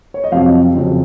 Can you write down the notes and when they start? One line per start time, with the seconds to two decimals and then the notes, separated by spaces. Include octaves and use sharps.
0.14 C#5
0.24 D#5
0.32 F2 C3 F#3 F5
0.75 F2 C#3 F#3